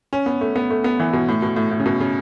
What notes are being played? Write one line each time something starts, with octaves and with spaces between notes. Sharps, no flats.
C#4
B3
A3
B3
A3
B3
E3
B2
A2
B2
A2
A2
C#3
B2
C#3